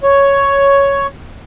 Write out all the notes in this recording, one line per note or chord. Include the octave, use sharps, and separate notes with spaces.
C#5